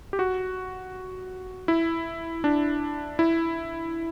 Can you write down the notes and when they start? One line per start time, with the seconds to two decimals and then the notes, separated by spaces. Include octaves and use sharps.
0.13 G4
0.19 F#4
1.68 E4
2.44 D4
3.19 E4